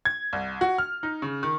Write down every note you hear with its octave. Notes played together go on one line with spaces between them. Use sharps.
G#6
C2
F#4
F6
D#4
C#3
D#3